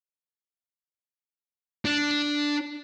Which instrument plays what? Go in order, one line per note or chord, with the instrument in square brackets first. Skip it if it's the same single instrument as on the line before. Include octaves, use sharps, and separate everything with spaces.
[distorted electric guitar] D4